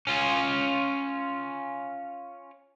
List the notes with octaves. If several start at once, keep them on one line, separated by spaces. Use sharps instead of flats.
C#4 F4